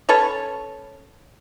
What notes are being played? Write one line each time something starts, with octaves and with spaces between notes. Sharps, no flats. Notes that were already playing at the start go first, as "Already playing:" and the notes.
C#4 A4 B4 C#5